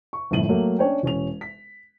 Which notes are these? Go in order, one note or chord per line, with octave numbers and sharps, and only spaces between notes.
C#6
G1 F2 A2 D#7 F#7
F#3 A3 A#3
C#4 D4 C#5 G5
E1 C#4 F7
B6